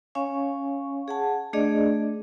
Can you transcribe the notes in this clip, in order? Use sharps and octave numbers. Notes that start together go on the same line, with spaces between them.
C#4 C#5 F5 G#5 C#6
G#4 F#5 A5
A3 D4 G#4 D5 D#5